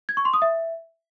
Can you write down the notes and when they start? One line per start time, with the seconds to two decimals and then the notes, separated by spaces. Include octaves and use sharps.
0.09 G#6
0.17 C#6
0.25 C6
0.34 D#6
0.42 E5